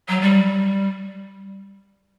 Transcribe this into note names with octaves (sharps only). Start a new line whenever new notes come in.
F#3
G3